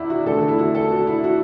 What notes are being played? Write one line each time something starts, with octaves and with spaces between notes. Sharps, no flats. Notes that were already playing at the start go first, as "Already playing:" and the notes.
Already playing: E2 E4 D5
F#4
E2 D3 A3 A4
F#4
E4
F#4
A4
F#4
E4
F#4